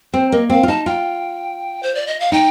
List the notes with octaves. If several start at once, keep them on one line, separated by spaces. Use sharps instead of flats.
C4 C5
A#3 D#5
C4 F5
F4
D#4 A5
F4 G5
C5
D5
D#5
F5
D#4 G5